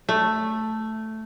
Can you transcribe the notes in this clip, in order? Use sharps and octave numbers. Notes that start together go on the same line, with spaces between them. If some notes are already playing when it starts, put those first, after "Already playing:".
A3